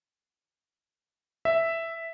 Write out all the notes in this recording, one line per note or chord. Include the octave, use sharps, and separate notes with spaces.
E5